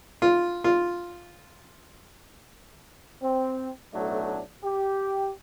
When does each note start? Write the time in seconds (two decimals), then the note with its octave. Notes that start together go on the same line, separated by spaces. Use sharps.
0.22 F4
0.64 F4
3.22 C4
3.94 B1 A2 F#3 A3 D4
4.64 G4